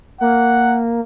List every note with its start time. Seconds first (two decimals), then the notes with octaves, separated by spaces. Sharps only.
0.21 A#3 F#5